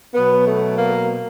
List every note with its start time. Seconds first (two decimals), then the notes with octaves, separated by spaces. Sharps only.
0.14 B2 F#3 B3
0.46 A3
0.78 A#3